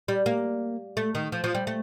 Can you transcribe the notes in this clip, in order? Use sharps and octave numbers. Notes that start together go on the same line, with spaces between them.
G3
A#3
A3
D#3
F3
F3
G3
A3